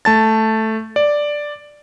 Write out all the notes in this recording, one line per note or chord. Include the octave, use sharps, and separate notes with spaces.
A3 A5 A6
D5